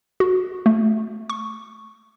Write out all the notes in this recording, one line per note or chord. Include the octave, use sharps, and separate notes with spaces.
F#4
A3
C#6